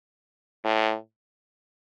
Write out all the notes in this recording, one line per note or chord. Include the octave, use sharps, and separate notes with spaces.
A2